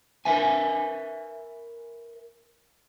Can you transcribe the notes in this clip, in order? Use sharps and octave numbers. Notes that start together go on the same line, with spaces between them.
A#4 B4 E5 G#5